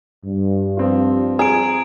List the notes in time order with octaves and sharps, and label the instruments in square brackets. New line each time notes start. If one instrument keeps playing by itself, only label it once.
[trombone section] G2
[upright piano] F3 C4 F4
[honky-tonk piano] G#4 [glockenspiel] A#5 D7